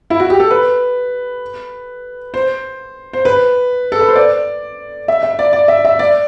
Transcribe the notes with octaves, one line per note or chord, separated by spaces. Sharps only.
E4
F#4
G4
A4
B4
C5
C5
B4
A4
B4
C5
D5
E5
E5
D5
D5
E5
E5
D5